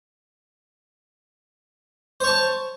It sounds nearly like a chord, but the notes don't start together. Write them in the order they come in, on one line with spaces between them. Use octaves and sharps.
C5 C#5 A5